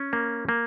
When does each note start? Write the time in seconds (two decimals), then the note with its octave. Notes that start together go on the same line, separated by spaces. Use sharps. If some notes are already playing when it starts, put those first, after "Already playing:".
Already playing: C#4
0.13 A#3
0.49 A#3